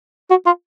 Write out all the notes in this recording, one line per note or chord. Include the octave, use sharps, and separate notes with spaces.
F#4
F4